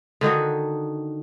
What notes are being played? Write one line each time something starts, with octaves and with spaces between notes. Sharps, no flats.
D3 D#3 D#4 F#4